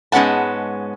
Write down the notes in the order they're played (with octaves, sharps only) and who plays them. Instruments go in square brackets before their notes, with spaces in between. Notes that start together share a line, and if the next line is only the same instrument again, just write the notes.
[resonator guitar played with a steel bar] G#2 G#3 B3 C#4 F#5 A5